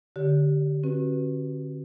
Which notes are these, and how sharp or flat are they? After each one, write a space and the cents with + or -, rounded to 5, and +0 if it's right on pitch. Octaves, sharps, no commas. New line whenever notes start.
D3 +0 G4 -15 C#5 +40
C#4 -45 F#4 -5 B4 +0